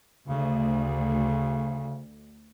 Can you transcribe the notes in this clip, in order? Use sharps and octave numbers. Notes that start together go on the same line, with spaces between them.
D2 C#3